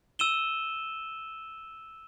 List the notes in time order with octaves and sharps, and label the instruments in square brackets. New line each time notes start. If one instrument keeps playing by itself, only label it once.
[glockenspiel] E6 D#7 E7 G7